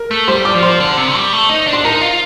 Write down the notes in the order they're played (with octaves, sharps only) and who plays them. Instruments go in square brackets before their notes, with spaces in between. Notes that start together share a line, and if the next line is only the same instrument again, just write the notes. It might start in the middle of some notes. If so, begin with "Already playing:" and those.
Already playing: [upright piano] A#4
[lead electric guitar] A3
[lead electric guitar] G3 [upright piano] C5 C6
[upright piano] D5 D6
[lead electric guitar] F3
[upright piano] C5 C6
[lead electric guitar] D3
C3
G3
A3
D#4
D4
[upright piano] C6
[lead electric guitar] D#4 [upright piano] A#4 A#5
[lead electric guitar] F4